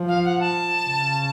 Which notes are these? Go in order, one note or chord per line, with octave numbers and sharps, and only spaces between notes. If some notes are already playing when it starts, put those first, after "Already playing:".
Already playing: F3
F5
F#5
A5
C#3